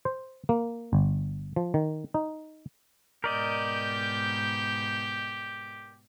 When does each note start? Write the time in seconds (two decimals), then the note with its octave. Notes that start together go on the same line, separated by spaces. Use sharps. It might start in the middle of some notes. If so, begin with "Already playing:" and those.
0.05 C5
0.49 A#3
0.93 G1
1.56 F3
1.74 D#3
2.14 D#4
3.24 G#2 B2 G4 A#4 D5 D#5 G6